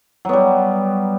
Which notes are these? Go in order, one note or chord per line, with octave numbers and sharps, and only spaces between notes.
F#3 G3 B3